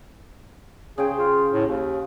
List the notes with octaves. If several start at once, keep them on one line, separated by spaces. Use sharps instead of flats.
C#3 G#4 C5 G5
F4
A2
D#2